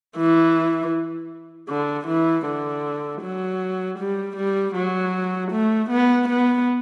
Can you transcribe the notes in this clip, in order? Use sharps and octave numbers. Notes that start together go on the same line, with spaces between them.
E3
D3
E3
D3
F#3
G3
G3
F#3
A3
B3
B3